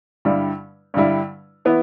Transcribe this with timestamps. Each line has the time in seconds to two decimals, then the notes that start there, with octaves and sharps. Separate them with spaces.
0.25 G2 D3 G3 E4
0.94 G2 D3 G3 E4
1.65 E3 B3 E4